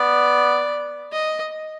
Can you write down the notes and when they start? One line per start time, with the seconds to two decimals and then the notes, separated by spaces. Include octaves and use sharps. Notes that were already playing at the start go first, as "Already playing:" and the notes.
Already playing: B3 D5
1.12 D#5